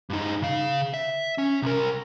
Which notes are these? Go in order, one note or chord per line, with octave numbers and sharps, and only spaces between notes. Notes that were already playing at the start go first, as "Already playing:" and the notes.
G2 D#4
C#3 F5
E5
C#4
C2 A#4